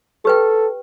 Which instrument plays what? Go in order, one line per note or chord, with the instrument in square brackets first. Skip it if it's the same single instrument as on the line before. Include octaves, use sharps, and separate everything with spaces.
[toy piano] G4 B4 G5 [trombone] A4